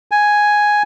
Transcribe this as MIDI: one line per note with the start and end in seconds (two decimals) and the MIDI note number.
0.11 0.83 80